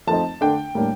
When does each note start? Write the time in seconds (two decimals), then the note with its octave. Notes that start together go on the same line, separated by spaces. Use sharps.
0.07 F3 A3 C4 D#4 A5
0.41 D3 A3 D4 G5
0.75 A2 G3 A#3 D4